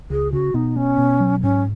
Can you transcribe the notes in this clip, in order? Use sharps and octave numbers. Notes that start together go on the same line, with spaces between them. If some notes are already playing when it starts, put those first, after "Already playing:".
C#2 G#4
C#3 F#4
B2 D#4
B3 C#4
B2
F#3
G#2 C#4